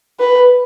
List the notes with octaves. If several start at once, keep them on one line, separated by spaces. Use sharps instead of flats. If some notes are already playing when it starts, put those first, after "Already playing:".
B4